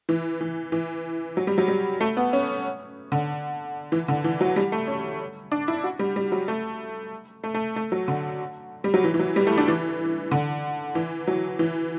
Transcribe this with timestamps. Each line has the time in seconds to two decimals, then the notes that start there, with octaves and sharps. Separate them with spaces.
0.09 E3
0.41 E3
0.72 E3
1.37 F#3
1.47 G3
1.58 F#3
1.68 G3
2.00 A3
2.17 B3
2.33 C#4
3.12 D3
3.92 E3
4.08 D3
4.24 E3
4.41 F#3
4.56 G3
4.72 A3
4.88 C#4
5.52 D4
5.68 E4
5.84 F#4
5.99 G3
6.16 G3
6.32 F#3
6.48 A3
7.44 A3
7.54 A3
7.76 A3
7.92 F#3
8.08 D3
8.84 G3
8.94 F#3
9.04 E3
9.14 E3
9.19 F#3
9.36 G3
9.47 A3
9.58 D4
9.68 E3
10.31 D3
10.95 E3
11.28 F#3
11.59 E3